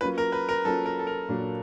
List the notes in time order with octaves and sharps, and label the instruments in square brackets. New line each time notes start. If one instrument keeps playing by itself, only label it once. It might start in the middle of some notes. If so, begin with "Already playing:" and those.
[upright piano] F#3 A#3 C#4 F4 [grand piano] B4
[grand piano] A#4
B4
A#4
[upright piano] F#3 A#3 C#4 F4 [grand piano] A4
[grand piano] A#4
A4
A#4
[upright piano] A#2 F#3 A#3 D4